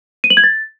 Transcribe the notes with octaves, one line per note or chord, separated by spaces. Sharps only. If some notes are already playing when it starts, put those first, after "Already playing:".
D#7
F#7
G#6
A6